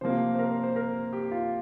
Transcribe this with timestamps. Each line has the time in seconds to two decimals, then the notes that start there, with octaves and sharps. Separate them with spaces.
0.01 C3 F3 A#3 C5
0.35 C5
0.39 A#4
0.51 C5
0.63 C5
0.76 A#4
1.13 G4
1.31 F4